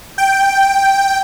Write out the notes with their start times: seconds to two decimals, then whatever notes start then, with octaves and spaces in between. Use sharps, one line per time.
0.18 G5